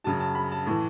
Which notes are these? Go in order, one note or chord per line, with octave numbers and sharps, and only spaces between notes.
F#2 C#3 F#3 A5
A5
B5
A5
A2 E3